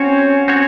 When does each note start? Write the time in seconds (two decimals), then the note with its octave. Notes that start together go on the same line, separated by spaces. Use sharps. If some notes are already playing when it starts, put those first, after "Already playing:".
Already playing: C4 C#4 F#4 C#5
0.48 C4 F#4 C#5